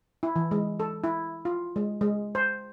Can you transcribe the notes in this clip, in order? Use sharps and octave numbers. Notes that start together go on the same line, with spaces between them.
E4
E3
G#3
A4
E4
F4
G#3
G#3
C5